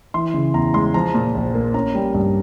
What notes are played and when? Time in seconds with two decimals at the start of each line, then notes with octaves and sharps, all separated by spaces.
0.14 E3 C6
0.34 C#3
0.54 E2 A#5
0.74 G#3 C6
0.94 F3 A#5
1.14 A#2
1.35 A#1
1.54 A#3
1.74 C#4 A#5
1.95 G3
2.14 G2